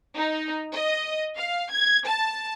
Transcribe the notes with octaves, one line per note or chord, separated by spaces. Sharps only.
D#4
D#5
F5
G#6
A5